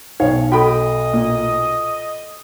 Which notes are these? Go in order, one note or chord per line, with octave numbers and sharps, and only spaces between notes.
B1 D#4 C#5 F5
F#4 A4 D#5 G5 B5
A#2